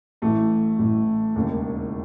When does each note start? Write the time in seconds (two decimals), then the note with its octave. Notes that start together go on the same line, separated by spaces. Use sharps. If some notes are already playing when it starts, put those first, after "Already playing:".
0.22 A1 A2 E3 A3
0.79 A1 A2 E3
1.35 E1 D#2 C#3